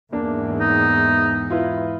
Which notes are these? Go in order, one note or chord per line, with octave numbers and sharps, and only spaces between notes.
E2 G#2 A#3 D4
D#4
E4 F4 B4